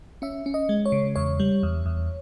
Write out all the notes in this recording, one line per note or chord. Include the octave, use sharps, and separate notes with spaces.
C#4 E5
C#4
D#5
G#3
C#5
C#3
E2 C#5
G3
E2
E2